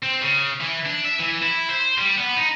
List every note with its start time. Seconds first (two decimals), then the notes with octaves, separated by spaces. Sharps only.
0.02 C4
0.22 C#3
0.61 E3
0.86 D4
1.05 E5
1.20 E3
1.42 E4
1.70 C5
1.98 G3
2.17 B3
2.37 D#4